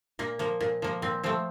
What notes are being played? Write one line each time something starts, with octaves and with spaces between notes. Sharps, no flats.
A#2 A#3
F3 A#3
A#2
F3 A#3
A#2 C4
F3 A3 C4